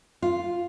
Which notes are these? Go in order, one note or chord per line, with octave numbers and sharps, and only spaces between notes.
F4